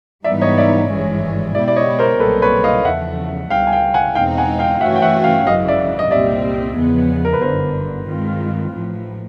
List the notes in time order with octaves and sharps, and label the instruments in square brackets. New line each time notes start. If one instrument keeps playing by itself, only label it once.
[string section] G#2 E3 G3 B3 D#4 [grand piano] D5 E5
[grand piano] C#5 D#5
D5 E5
[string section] G#1 G2 E3 G#3 C#4
[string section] B2 G#3 B3 E4 G4 [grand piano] D5 E5
[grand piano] D5
C#5 D#5
A#4 C5
[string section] B1 A#2 G3 C4 [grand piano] A4 B4
[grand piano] B4 C#5
D#5 F5
[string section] E2 C#3 F3 A3 [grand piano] E5 F#5
[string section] C#2 B2 G3 [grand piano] F5 G5
[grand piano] G#5
F5 G5
F#5 G#5
[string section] E2 B2 G#3 C4 D#4 [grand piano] F5 G5
[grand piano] F#5 G#5
F5 G5
[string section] G2 E3 A3 C#4 F#4 [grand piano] E5 F#5
[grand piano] G5
E5 F#5
F5 G5
[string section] G#1 F#2 C#3 E3 [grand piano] D#5 F5
[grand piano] D5 E5
D#5
[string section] C2 A#2 G3 C4 [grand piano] D5 E5
[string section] E2 C#3 F3 G#3 B3
[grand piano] A#4
B4
[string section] G1 F#2 D3 [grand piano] A#4 C5
[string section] G2 D#3 G#3 C4 F4
A1 A2 F3